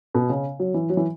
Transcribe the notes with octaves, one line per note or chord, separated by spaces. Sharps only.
B2
C#3
F#3
E3
F#3
E3